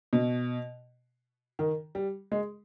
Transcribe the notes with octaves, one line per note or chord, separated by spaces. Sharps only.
B2
D#3
G3
G#3